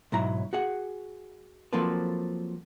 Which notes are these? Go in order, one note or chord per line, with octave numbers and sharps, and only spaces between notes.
B1 G#2 F#3 E4 A#5
F#4 G#4 F#5
F3 F#3 A#3 C4 A4 B4